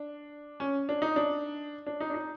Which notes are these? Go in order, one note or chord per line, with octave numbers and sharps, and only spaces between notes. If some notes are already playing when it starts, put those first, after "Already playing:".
Already playing: D4
C#4
D4
D#4
D4
D4
D#4
D4
D#4